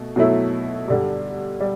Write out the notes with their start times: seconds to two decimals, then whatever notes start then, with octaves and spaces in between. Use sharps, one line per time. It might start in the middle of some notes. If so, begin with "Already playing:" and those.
Already playing: B2 A3
0.16 B2 F#3 A3 E4
0.88 G2 D3 G3
1.60 G3